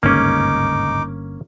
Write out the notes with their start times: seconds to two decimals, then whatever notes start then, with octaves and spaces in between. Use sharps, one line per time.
0.03 G1 D#2 G#2 C#3 A#3 C#4 D#4 D6